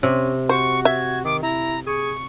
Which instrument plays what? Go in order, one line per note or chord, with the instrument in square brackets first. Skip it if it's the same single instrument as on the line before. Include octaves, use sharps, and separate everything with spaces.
[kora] C3 [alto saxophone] C#4
[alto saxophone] F#4 [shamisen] C5 [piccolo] C#6
[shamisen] E5 [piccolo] G#6
[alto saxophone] D#3 [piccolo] D6
[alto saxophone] E4 [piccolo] A#5
[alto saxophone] G#4 [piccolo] C#6